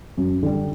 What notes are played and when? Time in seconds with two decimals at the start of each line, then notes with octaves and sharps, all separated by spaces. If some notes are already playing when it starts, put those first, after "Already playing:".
0.17 F#2
0.43 D3 G3